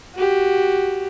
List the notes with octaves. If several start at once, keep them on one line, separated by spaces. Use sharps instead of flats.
F#4 G4